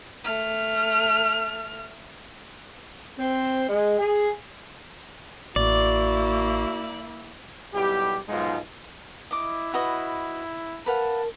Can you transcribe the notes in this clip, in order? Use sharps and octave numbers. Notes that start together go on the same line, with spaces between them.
A3 F6
C4
G#3
G#4
A1 A#3 E4 F#4 D5
B1 G3 E4 G4
B1 G#2 F3 G#3 D#4 F4
E4 D#5 D6
F#4 B4 D#5
A#4 B4 F5 F#5 A5